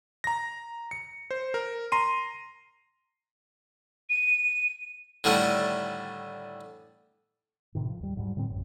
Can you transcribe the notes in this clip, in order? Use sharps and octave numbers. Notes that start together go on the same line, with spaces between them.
A#5 A#6
C#7
C5
A#4
A#5 C6 D#7
D#7
A2 D3 D#3 G3 A3
A2 C3 D#3
F3
D#2 G3
G#2 F#3 G3
A2 D3 G3 C4
A1 F#2 B2